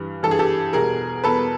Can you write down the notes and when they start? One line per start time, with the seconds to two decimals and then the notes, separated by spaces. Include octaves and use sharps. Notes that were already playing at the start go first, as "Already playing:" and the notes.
Already playing: G2 E3 G3
0.23 G2 E3 G3 A4
0.31 G#4
0.39 G4 A4
0.73 E2 B2 G3 G#4 A#4
1.24 E2 B2 G3 A4 B4